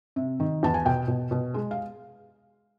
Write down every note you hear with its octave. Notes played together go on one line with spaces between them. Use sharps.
C3
D#3
E2 A5
G#5
B2 G5
B2
B2
G#3
F5